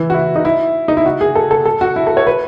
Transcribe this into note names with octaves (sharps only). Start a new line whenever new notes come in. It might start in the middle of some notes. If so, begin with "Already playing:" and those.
Already playing: E3
F#4
E4
D#4
E4
D#4
E4
F#4
G#4
A4
A4
A4
F#4
E4
A4
C#5
B4